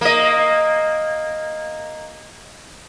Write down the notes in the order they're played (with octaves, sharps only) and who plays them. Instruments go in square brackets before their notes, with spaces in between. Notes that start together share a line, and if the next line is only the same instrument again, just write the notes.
[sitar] A#3 D#5